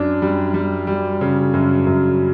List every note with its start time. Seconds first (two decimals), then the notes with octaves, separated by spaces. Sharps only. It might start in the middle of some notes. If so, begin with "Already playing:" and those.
Already playing: F#2 D4
0.22 G3
0.54 G3
0.87 G3
1.21 C#3
1.54 F#2
1.86 F#2